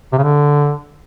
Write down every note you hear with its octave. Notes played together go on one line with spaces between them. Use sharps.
C3
C#3
D3